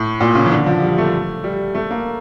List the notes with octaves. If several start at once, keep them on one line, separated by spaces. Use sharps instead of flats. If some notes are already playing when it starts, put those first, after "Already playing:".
Already playing: A2
A#2
C#3
E3
D3
F3
G3
A3
G3
A3
A#3